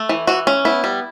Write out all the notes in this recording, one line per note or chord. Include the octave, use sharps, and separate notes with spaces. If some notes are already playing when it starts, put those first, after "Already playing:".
Already playing: A3
E3
E3 F#4
C#4
B3 E4
G3